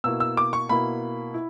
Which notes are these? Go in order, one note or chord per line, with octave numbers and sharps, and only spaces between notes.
B2 A#3 E4 E6
E6
D6
C#6
B2 A#3 E4 B5
E4